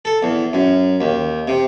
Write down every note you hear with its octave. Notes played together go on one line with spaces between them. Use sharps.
A4
E2
F#2
D#2
C3